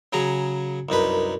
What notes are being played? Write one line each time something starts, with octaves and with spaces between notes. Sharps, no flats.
C#3 F#3 G#4 A#5
C2 F#2 D#4 B4